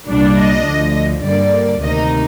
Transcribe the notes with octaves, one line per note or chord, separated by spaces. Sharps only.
C2 A#2 G3 D4
D#5
D2 D3 F3
G2 D3 G3 A#3 D5
D2 C3 D#3 A#3 D#4 D#5